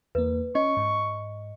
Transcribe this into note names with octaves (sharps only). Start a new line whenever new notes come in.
E2 A#3 B4
C#4 D#5 C#6
G#2